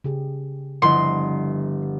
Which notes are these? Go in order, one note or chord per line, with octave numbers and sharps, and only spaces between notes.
C#3 G4 G#4
G1 F3 E4 D#5 C6